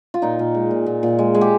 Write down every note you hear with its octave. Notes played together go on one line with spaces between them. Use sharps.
F4
A#2 D#4
A#2
G#3
A#2
A#2
A#2
G#3
G#3
G4